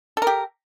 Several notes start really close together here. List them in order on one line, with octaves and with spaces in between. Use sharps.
A4 A#4 G4